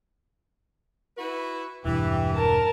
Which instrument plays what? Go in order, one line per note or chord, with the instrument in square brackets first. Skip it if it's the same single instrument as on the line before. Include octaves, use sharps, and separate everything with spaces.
[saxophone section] E4 F#4 B4
[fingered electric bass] E1 G2 [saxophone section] E3 [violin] G4
[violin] A#4 A5